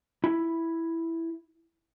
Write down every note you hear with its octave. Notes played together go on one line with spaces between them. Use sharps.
E4 B5